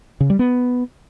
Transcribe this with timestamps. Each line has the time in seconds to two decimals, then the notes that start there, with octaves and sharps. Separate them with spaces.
0.20 C#3
0.30 G3
0.39 B3